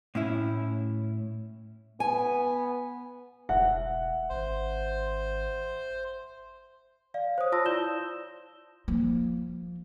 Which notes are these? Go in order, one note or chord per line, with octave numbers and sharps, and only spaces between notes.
A2 C#4 E4
B3 G#5
E1 E5 F#5
G#1 C5
D5 F5
C5 C#5 D#6
F4 A5 C6 D#6 E6 A#6
E4 D5 G6 E7 G7
F3 A#3